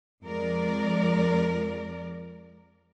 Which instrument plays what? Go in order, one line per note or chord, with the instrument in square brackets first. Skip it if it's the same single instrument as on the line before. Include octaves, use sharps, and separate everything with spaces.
[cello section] F2 F3 G#3 A#4 D5